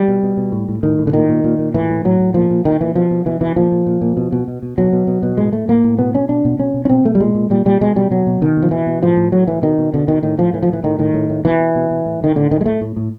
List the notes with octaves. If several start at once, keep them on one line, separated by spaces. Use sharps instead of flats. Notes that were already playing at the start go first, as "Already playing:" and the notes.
Already playing: G3
B2
B2
B2
A2
A2
A2 D#3
A2
D3
A#2 D#3
A#2
A#2
A#2
A2 E3
A2
A2 F#3
A2
A#2 F3
A#2
A#2 D#3
A#2 E3
B2 F3
B2
B2 E3
B2 E3
A#2 F3
A#2
A#2
A#2
B2
B2
B2
B2
B2 F#3
B2
B2
B2
A2 G#3
A2 A3
A2 A#3
A2
B2 B3
B2 C#4
B2 D4
B2
B2 C#4
B2
C#4
B2 C4
B2 A3
G3
A#2 G#3
A#2
A#2 G3
A#2 G3
B2 G#3
B2 G3
B2 F#3
B2
B2 D#3
B2
F3
B2 E3
B2
A2 F3
A2
A2 F#3
A2 E3
B2 D#3
B2
B2 D3
B2 D#3
A2 D#3
A2 F3
A2 E3
F3
A2 E3
A2 D#3
A2 D#3
A2
A2
B2 E3
B2
B2
B2
A2
A2 D#3
A2 D3
A2 D#3
G#3
A2 A3
A2
A2